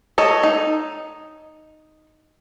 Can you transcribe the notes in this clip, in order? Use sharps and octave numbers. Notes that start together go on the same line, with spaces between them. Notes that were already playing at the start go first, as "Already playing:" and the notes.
A4 C#5 D#5
D#4